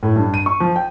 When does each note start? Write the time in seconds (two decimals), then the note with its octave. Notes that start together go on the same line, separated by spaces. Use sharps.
0.03 A2
0.16 G2
0.34 D#7
0.46 C#6
0.60 F3
0.76 G5